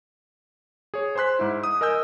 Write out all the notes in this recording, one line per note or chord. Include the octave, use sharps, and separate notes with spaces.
G#4 C#5
C5 G#5 C6 F#6 B6
G#2 E4
D#6
A#4 D#5 G#5 E6 G6